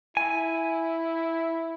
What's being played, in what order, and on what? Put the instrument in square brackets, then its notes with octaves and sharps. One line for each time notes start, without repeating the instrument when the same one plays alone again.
[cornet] E4 [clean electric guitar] G#5